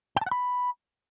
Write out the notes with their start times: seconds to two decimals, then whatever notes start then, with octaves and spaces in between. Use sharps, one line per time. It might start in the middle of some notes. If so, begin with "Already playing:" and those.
0.16 G5
0.21 A5
0.26 F#5
0.31 B5